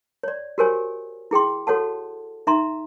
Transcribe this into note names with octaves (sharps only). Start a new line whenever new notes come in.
C#5 D5
F#4 G4 A#4 C5 C#5 G#5
E4 G#4 G5 C6
F#4 A4 C#5 F#5 A5
D#4 E5 A#5 C6